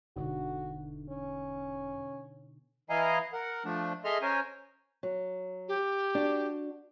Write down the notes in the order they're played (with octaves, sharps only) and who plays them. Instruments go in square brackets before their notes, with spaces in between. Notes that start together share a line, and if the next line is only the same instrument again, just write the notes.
[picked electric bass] E1 [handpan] B2 D3 D#4 [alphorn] F#4
[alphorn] C#4
[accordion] E3 E4 D#5 F5 G#5 A#5
A#4 F#5
F3 A3 D4
G#4 A4 D#5 E5 C6 F6
C#4 A#4 C5 C#5 G#5
[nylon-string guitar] F#3
[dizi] G4
[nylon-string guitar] D4 F#4